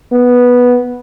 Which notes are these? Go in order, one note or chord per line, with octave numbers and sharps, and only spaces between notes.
B3